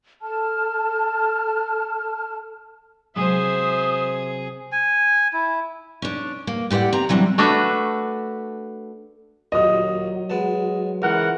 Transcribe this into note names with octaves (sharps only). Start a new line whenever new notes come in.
A4 A5 F6
C3 F#3 G#3 G#4 C5 E5 D#6
G#5
E4
C#4 D4
A#3
A2 G4 B4 D5 F#5
C4 A#5
E3 F#3 G3 C4 D4
A3 D4 F#4 B4 E5
D#2 A#2 F#3 D#5 D#6
G#3 B3 A5
C#2 E3 A#4 F#5